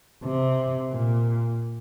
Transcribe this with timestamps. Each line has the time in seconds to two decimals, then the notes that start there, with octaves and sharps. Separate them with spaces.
0.24 C3
0.91 A#2